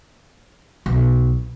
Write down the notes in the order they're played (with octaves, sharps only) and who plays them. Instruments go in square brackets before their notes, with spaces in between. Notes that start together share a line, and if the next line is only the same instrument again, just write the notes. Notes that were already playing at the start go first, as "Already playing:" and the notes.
[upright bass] B1